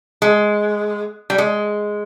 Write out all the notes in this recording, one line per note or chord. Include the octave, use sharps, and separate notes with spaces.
G#3
G3
G#3